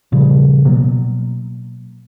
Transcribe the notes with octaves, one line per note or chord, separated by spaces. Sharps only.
A#2 C#3 F3 G3
B2 F#3 A#3